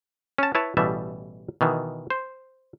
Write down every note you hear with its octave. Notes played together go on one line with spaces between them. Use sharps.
C#4 A5
E4 B4 C#5 A5
A1 B2 E3 G3 E5 A5
B2 D#3 E3
C5